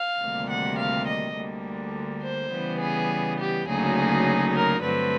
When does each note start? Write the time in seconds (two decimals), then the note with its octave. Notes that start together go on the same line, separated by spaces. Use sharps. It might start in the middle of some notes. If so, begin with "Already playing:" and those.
Already playing: F5
0.21 D2 C3 D#3 G3 A#3
0.49 F#5
0.78 F5
1.07 D#5
1.36 D2 D3 G3 A#3
2.23 C5
2.51 C#3 E3 G3 B3
2.80 G#4
3.38 G4
3.66 D2 C#3 F#3 A#3 D#4 G#4
4.54 A#4
4.82 G2 D3 F#3 A3 C4 B4